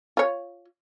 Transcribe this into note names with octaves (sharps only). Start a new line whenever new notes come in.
F4 C#5